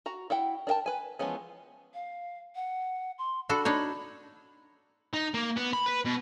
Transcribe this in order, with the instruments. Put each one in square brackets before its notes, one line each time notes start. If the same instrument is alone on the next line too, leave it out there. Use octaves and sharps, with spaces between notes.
[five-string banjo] F#4 A#5
E4 F#5 G5
D4 A#4 G5 A5
B4 G#5
E3 F3 G#3 B3 C#4
[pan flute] F5
F#5
C6
[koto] D4 F#4 A4 [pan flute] B5
[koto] D4 D#4 C#5 [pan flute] B5
[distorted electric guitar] D#4
A#3
B3
B5
B4
B2